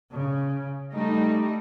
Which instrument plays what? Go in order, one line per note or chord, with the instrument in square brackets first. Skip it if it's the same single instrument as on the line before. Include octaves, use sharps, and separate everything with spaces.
[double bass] C#3
[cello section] G3 D#4 [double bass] A3